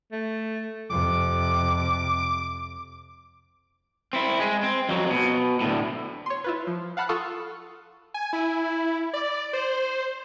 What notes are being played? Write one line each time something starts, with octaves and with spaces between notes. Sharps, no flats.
A3
F2 C3 D6
C4 E4
G#3
C4
F2 F#3
B2
D2 A2
C#5 C6
E4 F4 B4
F3
F5 F#5 A5 B5 F6 F#6
F4 A4 F5 C#6 D#6
G#5
E4
D5
C5